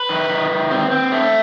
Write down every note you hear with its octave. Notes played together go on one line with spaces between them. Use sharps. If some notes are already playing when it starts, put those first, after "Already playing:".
Already playing: B4
D#3
D#3
D#3
C4
C4
A3